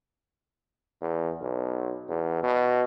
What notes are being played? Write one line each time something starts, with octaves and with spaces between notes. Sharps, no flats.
E2
B1
E2
B2